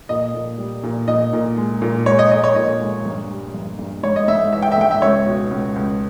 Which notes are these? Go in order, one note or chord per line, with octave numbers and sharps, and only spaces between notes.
A#2 D#5
A#2
G3
A#2
A#2 D#5
A#2
G#3
A#2
G#3 C#5
D#5
G#3 D#5
C#5
A#2 D#5
G#3
G2
G3
G2
G2
G#2 C#5
D#5
G#2 E5
E3 E5
G5
E5
G#2 G5
E5
C#2 C#5
B2
C#2
C#2